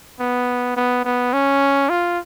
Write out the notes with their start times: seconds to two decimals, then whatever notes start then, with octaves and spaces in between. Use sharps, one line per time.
0.20 B3
0.77 B3
1.05 B3
1.33 C#4
1.89 F4